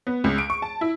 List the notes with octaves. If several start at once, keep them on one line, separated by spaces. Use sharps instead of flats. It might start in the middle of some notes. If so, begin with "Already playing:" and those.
B3
C#2
D7
C#6
A5
E4